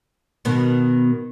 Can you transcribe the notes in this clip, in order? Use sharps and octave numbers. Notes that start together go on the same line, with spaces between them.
B2 D#3 B3